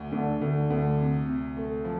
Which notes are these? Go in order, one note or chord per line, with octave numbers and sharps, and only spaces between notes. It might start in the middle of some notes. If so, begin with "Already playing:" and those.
Already playing: D2
D2 D3
D2 D3
D2
C3
C3
A3
F3